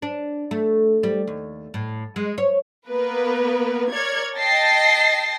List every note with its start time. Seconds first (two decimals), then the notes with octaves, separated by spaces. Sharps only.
0.02 D4
0.51 A3
1.03 G3
1.27 D#2
1.74 A2
2.16 G#3
2.38 C#5
2.88 A#3 B3 A#4 B4
3.91 A#4 C#5 D5 G#6
4.38 D#5 G5 A5 A6 A#6 C7